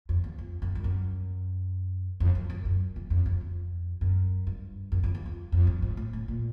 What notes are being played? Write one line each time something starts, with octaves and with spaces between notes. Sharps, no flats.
F2
E2
F2
F#2
G2
F#2
F2
F#2
F#2
F#2
E2
F2
F2
F2
F#2
G2
F#2
F2
E2
F2
F2
G2
G#2
A2
A2
A#2